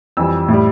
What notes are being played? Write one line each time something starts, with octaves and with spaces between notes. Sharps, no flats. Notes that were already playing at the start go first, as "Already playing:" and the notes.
F2 E3 G3 E6
A2 G3